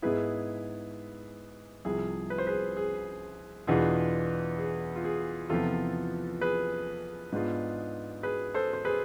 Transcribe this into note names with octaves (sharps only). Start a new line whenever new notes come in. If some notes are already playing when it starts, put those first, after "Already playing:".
G#2 G#3 B3 E4 G#4 B4
C2 C3 F3 G#4
B4
C5
G#4 B4
G#4
E2 B2 B3 D4 F4 G#4
G#4
F4
G#4
E2 C3 F3 B3 F4 A4
G#4 B4
G#2 G#3 B3 D4 F4
G#4 B4
A4 C5
C5
G#4 B4